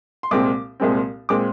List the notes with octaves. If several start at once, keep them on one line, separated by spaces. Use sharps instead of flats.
C6
C2 A#2 G#3 C4 D6
C2 A#2 G#3 C4
A#2 G#3 C4 D6